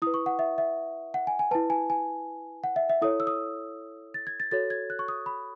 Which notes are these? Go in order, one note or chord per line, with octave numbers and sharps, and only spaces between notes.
E4 B4 D#6
C#6
F#5
E5
E5
F#5
G#5
G#5
E4 B4 A5
G#5
G#5
F#5
E5
E5
E4 A4 C#5 D#6
E6
D#6
A6
G#6
A6
F#4 A4 C#5 A6
G#6
F#6
C#6
D#6
B5